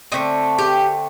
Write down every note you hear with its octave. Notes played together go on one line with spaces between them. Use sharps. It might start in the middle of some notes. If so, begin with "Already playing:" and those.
D3 A3 C4 D#4
G4